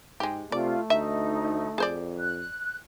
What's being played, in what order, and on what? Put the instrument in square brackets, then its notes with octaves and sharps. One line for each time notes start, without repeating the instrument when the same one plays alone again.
[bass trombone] G#2 [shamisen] G#3 G4
[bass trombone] C3 [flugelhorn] A3 [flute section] F4 [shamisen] D5
[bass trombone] D2 [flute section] D#4 [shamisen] E5
[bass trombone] F2 [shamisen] G#4 C5 D5
[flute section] F#6